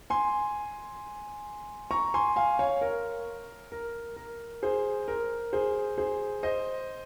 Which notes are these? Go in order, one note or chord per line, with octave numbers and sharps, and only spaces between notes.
G#5 C6
A#5 C#6
G#5 C6
F5 G#5
C#5 F5
A#4
A#4
A#4
G#4 C5
A#4
G#4 C5
G#4 C5
C5 D#5